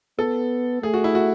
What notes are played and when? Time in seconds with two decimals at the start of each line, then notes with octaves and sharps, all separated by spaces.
0.19 B3 A4
0.83 A3 G#4
0.94 F#4
1.04 E4
1.15 F#4